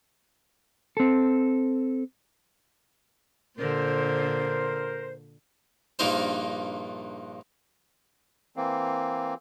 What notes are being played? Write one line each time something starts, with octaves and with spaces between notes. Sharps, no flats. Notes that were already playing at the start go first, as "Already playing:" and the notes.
C4 A4
A#2 D3 A#4 C5
A#1 G2 A#3 D#4 A#4 C5
E3 A#3 C4